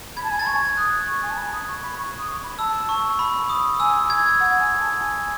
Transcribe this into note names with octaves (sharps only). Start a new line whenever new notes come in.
B5 G#6
A5
G#5
A5 A6
B5
C#6 G#6
D#6 F#6
C#6
G#5
A5
B5
D#6
C#6
C#6
B5
C#6
D#6
C#6
B5
A5 E6
C#6
B5
D#6
G#5 E6
G#6
F#5
G#5
A5
G#5